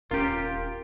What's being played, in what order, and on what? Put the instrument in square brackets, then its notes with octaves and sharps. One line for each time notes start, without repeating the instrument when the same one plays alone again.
[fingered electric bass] D#1 C#4 [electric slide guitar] F4 G4 [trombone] A#4